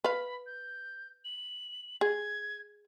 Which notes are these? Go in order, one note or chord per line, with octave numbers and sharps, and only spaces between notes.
B4 F5 B5
G6
F#7
G#4 G#6